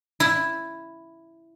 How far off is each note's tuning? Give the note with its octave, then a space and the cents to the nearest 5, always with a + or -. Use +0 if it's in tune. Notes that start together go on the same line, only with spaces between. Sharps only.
E4 +5